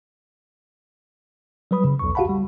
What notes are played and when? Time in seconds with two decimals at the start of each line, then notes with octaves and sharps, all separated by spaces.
1.71 F#3 G3 B4 B5 D#6
1.84 C#3
1.99 B1 E2 C#6
2.15 F#4 G4 F5 F#5 A5 B5
2.29 G3